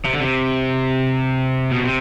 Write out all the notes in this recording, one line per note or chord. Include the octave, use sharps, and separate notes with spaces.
C3
D3
C3
B2
C3